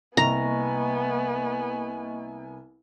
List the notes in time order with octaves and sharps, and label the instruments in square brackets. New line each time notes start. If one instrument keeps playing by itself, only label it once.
[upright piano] C2 [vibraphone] A#3 D#5 C#6 [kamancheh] B3 G#5 [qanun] A#5